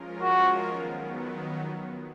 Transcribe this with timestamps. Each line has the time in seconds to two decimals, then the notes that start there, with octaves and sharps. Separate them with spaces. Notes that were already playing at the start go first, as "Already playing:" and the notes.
Already playing: F3 G#3 C#4 F4 A#4
0.22 F#4
0.67 D#3 F#3 B3